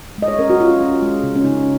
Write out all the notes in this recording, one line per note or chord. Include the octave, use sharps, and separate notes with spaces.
G#3 D#5
C#5
C#4 A#4
F#4
C#4 F4
C#4
G#3
C#3
C#4
C#3 D#4